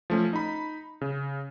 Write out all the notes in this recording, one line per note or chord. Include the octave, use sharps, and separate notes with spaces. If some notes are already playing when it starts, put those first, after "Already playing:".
F3 A3 C#4
D#4 B5
C#3